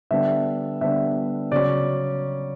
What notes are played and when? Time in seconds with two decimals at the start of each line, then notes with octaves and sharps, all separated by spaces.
0.11 D3 G3 B3 D4 E5
0.81 D3 G3 B3 D4 E5
1.52 C#3 F#3 C#4 D5